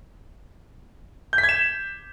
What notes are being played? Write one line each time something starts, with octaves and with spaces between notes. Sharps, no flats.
G6
B6
G#6
E7